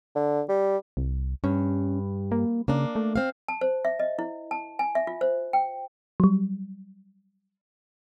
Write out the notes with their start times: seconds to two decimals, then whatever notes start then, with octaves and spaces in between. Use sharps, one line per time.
0.15 D3
0.49 G3
0.97 C2
1.44 G2 C#4
2.32 A#3
2.68 C#3 A#3 D4
2.96 A3
3.16 C4 F5
3.48 A5
3.61 C5
3.85 E5
4.00 D#5
4.19 E4
4.51 A5
4.79 G#5
4.95 E5
5.07 F4
5.21 C5
5.53 G5
6.20 F#3 G3